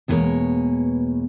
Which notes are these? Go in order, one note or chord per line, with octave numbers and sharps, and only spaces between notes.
E2 B2 E3 G#3 A#3 C#5